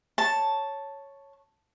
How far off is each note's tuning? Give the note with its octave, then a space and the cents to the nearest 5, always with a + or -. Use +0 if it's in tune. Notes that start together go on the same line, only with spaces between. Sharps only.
C#5 +0 A5 +0